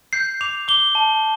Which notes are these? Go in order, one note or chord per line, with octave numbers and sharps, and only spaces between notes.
G6 C7
D6 F7
D6 G7
A5